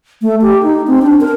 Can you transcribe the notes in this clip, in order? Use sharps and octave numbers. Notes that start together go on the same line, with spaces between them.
A3
G4
D#4
C4
D4
A#4